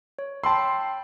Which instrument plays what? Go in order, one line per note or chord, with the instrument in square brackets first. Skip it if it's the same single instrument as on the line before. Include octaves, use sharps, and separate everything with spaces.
[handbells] C#5
[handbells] G5 B5 E6 [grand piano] A5 C6